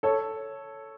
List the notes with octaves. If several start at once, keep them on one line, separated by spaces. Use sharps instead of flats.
A4 C#5